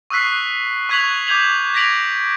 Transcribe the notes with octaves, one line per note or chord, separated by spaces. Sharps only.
C#6 D#6 E6 F#6 B6 C7
C#6 F#6 G#6 B6 F7 F#7
D6 G6 G#6 F7 F#7
G#6 A#6 B6 D7 F7 F#7